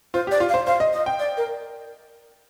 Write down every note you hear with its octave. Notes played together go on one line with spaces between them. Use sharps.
F4 C5
G4
D5
F4
F5
C5
C5 F5
D#5
D#5
G5
D5
A#4